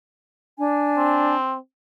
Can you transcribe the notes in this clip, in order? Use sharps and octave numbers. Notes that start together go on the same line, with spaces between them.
D4 G#5
C4